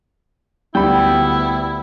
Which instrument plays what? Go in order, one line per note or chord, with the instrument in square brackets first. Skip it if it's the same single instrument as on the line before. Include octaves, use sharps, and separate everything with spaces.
[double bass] D2 B3 [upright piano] G3 B5 [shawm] E4 [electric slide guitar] G5